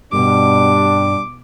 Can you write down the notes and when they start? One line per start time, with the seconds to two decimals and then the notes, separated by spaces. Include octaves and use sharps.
0.13 G2 B2 G3 D4 D6